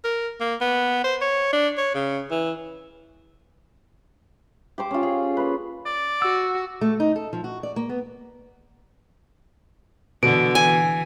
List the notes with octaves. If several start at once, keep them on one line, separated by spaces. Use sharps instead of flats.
A#4
A#3
B3
C5
C#5
D4
C#5
C#3
E3
G4 C5 D6
C#4 F4
G#4
A#3 B4
D5
F#4 E6
A3
D#4
A4
F3
F#4
D5
A#3
B3
B2 D3 E3 D7
E3 G#5